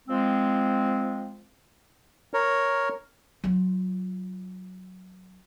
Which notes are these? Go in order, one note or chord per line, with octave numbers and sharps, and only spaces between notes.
F3 G#3 C4
A#4 C#5
F#3 F4